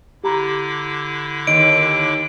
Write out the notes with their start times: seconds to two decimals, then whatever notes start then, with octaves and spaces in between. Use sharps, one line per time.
0.24 D3 E4 G4 A#5 B5 D6
1.47 D#2 D#5 D7